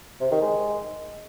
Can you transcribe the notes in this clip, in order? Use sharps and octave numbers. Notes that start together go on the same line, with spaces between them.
C3
D#3
G#3